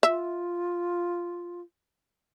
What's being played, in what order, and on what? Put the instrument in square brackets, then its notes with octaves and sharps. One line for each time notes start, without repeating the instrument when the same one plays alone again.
[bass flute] F4 [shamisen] E5